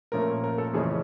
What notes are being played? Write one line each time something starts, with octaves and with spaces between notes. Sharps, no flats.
A#2 F3 A3 C#4 A#4
A#4
A4
F2 C#3 E3 A3 C#4 G#4